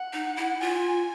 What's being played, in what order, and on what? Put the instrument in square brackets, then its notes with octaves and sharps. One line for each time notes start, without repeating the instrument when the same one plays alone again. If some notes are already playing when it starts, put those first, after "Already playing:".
Already playing: [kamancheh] F#5
[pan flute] D#4
E4
[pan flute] F4 [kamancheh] G#5